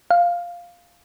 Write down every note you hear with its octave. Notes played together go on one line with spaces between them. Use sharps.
F5